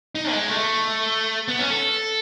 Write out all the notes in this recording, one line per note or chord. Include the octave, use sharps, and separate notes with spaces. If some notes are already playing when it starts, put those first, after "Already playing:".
D#4
G#3
A3
B3
C#4
A4